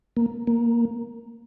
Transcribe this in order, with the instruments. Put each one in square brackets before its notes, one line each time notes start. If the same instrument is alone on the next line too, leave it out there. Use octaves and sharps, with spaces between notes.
[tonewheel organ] A#3
A#3